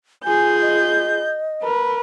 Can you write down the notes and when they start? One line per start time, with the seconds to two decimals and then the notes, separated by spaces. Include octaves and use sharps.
0.24 F4 G#4 G#5 G6
0.61 D#5
1.64 A#4 B4